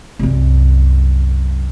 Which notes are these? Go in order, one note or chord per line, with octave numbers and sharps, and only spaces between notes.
C2 F#2